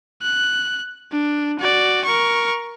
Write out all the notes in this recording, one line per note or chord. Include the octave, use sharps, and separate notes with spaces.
F#6
D4
F#4 D5
A#4 C#6